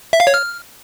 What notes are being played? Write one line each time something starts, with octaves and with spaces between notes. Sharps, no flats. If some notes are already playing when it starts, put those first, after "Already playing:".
E5
F5
C#5
F6